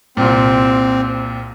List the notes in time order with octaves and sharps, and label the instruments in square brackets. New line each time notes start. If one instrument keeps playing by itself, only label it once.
[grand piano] C2 A#2 [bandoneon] C4